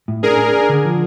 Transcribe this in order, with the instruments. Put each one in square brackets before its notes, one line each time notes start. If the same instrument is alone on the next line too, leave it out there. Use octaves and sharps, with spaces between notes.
[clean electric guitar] A2
[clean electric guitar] D4 [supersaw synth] G#4 A#4
[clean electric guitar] D4
D4
D3
F3